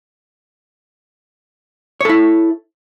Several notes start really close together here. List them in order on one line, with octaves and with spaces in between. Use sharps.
C#5 A4 E4